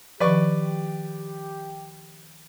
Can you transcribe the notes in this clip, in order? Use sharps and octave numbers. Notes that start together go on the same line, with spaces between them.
D#3 F3 G4 B4 D5 C#6